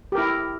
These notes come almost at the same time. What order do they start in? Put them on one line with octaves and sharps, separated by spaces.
G4 A#4 E4